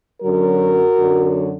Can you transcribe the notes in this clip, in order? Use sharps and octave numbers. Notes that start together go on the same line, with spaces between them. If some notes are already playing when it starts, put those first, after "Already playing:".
F#2 D3 F#3 F#4 A#4
F#2 D3 F#3